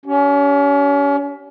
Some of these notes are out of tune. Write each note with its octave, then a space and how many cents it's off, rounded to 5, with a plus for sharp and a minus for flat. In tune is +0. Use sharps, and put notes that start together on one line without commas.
C#4 +35 G4 -30